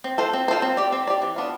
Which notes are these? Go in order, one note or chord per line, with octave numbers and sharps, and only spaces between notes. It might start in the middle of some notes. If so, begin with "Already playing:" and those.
C4
F4 A4 C5
C4
F4 A4 C5
C4
G4 D5
C4
G4 D5
E3
B3 D4 F4